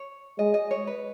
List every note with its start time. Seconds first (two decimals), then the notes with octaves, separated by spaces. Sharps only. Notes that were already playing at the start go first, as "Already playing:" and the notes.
Already playing: C#5
0.38 G#3 D#5
0.54 D#5
0.71 C#5
0.87 B4